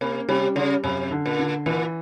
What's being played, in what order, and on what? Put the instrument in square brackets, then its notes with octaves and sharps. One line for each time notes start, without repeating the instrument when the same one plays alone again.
[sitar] C3 [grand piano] A#3
[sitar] C3 [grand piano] G3
[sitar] C#3 [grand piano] G3
[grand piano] F#2 [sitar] C3
[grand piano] D3
[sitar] A#2
[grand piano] D3
[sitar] A#2 [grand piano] E3